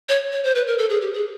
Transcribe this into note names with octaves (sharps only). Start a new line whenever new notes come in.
C#5
C#5
C5
B4
A#4
A4
G#4
G4
G#4